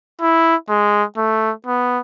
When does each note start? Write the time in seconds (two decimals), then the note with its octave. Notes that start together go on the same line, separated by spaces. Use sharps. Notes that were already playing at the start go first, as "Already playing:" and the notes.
0.21 E4
0.69 G#3
1.17 A3
1.66 B3